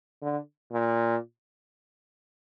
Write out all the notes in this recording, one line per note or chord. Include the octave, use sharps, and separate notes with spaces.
D3
A#2